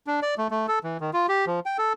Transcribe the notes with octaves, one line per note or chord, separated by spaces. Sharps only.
D4
D5
A3
A3
A4
E3
D#3
F4
G4
F3
G5
A4